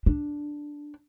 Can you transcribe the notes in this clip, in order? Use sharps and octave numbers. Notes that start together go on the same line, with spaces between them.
D4